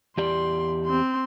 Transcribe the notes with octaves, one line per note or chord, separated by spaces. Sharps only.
E2 G4 D5 C6
C4 C6